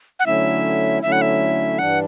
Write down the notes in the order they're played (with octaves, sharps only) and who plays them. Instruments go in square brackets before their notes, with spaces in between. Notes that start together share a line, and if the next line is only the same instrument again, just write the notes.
[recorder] F#5
[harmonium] D3 F#3 A3 C#4 E4 [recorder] E5
[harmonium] D3 F#3 A3 C#4 E4 [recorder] E5
[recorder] F#5
E5
[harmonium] G2 E3 G3 D4 [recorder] F#5